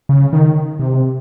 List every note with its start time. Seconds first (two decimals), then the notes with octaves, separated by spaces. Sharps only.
0.09 C#3
0.33 D#3
0.80 C3